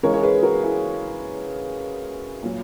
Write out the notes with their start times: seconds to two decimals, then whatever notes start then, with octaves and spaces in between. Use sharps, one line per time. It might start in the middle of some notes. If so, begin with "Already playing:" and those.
0.03 C#3 E3 G#3 A#4 C#5
0.14 C#5
0.23 G#4 B4
0.43 F#4 A#4
0.63 E4 G#4
2.43 A#2 F#3